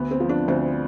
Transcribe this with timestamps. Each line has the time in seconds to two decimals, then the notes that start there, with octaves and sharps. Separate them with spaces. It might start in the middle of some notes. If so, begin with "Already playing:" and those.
Already playing: D2 B3
0.11 C4
0.20 F3
0.29 D4
0.48 D2 C4